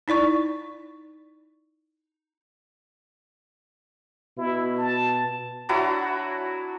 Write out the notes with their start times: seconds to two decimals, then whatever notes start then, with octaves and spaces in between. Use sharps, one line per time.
0.08 D#4 E4 D5 C#6
4.38 B2 E4
4.78 A5
5.69 F#3 D4 E4 F#4